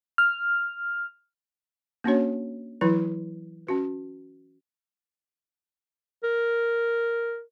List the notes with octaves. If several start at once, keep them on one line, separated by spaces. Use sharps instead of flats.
F6
A#3 C#4 D4 F#4 C#5
E3 F#3 E4 B4
C#4 F#4 B4
A#4